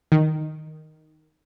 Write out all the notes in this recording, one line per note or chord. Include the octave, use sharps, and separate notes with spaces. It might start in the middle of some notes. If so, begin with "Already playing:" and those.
D#3